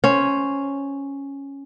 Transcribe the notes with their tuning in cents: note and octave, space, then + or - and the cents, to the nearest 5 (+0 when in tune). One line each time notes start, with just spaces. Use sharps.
C#4 +0 C5 +0